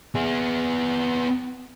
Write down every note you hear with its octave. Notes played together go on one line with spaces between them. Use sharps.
B3 G#4